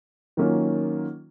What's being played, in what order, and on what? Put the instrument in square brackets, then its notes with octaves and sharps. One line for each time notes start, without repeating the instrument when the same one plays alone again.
[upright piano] D#3 F#3 A#3 C#4 F4